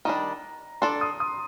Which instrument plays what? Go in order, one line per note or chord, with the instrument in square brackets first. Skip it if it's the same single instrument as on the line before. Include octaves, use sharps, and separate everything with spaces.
[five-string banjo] D#3 G3 D4 [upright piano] A#5
[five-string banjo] D4 A4 D5 [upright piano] C6
[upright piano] D#6
D#6